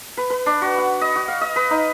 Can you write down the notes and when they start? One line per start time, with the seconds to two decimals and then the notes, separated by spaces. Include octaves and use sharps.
0.17 B4
0.30 B4
0.46 D4
0.62 F#4
0.78 F#5
1.01 D#5
1.16 F#4
1.28 F5
1.41 D#5
1.56 B4
1.70 D#4